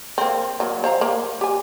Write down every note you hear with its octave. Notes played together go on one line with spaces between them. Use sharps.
A#3 C4
F#3 A#3
C5 F5 A#5
A#3
G4 G#5